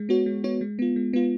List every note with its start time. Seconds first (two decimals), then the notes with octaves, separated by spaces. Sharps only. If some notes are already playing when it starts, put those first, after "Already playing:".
Already playing: G#3
0.09 B3 F#4 C#5
0.26 G#3
0.44 B3 F#4 C#5
0.61 G#3
0.79 B3 F4
0.96 G#3
1.13 B3 F4